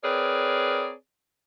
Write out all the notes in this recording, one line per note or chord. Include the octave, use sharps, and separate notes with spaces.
C4 G#4 A#4 B4 C#5 D5